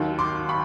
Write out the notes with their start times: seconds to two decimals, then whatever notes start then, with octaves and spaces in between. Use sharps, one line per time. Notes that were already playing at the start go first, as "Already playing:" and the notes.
Already playing: D#2 D#3 F#3
0.19 C6 D6
0.49 B5 C#6